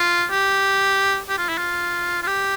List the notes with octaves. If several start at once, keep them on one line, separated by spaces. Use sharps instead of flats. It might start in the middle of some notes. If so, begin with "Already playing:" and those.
Already playing: F4
G4
G4
F4
E4
F4
F4
G4